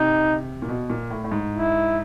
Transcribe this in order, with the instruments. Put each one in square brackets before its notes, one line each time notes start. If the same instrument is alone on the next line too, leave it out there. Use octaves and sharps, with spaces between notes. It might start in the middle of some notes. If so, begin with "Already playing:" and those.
Already playing: [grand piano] C3 [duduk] D#4
[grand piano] A#2
B2
A#2
A2
A2
G#2
[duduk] E4